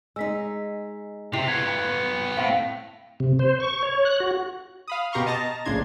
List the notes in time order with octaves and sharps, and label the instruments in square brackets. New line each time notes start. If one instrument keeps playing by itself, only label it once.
[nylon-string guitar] G#3 D#4 [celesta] E6 B6
[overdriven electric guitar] C3 [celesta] E4 C7 F7
[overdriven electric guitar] B3 F4 [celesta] G#6
[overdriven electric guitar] A2 [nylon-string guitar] C4 [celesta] F5
[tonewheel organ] C3
C5
C#6
C#5
F#6
F#4
[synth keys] F5 B5 D#6
B2 G4 A#5 C6 C#6 F6
D#5 A5 A#5 A#6
A#1 A2 C#3 D4 C6 G#6